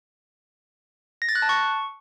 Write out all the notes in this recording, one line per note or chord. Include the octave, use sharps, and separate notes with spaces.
A#6
A6
F#6
A5
C#6